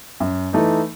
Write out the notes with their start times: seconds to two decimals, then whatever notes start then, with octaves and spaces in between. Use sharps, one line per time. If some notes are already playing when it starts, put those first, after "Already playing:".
0.20 F#2
0.53 E3 A3 D#4